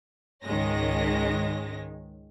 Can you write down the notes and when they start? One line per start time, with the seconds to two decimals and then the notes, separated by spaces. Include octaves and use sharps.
0.44 C#2 G#2 D#3 G#3 C#4 A#6